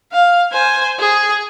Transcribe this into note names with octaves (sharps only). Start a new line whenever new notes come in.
F5
C5 G#5
G#4